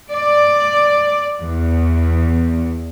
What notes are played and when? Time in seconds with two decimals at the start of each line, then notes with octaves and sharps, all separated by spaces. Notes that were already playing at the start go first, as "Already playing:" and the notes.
0.13 D5
1.41 E2